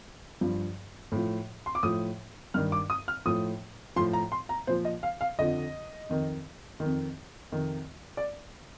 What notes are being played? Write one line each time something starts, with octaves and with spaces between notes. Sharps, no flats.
G2 F3
A2 F3
C6
D6
A2 F3 D#6
G2 D#3 F6
D6
D#6
F6
A2 F3 D#6
A2 F3 C6
A#5
C6
A#5
A#2 F3 C5
D#5
F5
F5
F2 D3 F3 D#5
F2 D#3
F2 D#3
F2 C3 D#3
D5